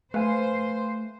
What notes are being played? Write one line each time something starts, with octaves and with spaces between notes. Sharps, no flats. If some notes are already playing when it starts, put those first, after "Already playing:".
A3 B4 C5 F5 G#5